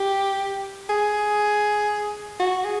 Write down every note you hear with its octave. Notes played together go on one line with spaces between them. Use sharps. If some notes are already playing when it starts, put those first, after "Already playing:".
Already playing: G4
G#4
F#4
G#4